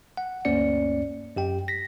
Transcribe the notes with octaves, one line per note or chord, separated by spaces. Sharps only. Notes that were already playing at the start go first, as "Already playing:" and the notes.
F#5
D2 G2 A#3 C#4 D5 C#7
F#2 G4 G5
A#6 B6